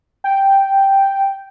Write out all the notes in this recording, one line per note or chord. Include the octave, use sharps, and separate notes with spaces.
G5